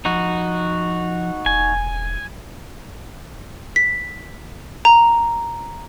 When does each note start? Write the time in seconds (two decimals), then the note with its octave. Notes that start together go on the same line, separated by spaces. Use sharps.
0.05 F3 D#4 F#4
1.46 E1 G#5
3.76 B6
4.85 A#5